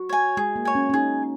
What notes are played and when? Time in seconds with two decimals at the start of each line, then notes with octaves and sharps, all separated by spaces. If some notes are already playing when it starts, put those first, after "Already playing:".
Already playing: F#4
0.09 C#5 G#5
0.37 G#3 G#4
0.56 A#3
0.65 C#5 G#5
0.75 C#4
0.89 C#4
0.94 D#4 G#4